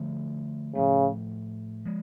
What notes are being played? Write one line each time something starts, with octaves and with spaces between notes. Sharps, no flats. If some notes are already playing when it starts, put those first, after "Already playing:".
Already playing: D3 F3 A3
A2 C#3 F3 A3
F3 G#3